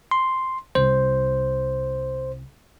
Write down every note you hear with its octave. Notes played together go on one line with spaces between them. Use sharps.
C6
C2 C5